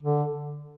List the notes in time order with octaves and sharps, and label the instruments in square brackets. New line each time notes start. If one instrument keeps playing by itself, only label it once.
[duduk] D3